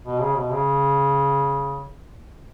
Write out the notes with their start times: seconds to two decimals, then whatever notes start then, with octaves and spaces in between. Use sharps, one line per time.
0.05 B2
0.21 C#3
0.36 B2
0.52 C#3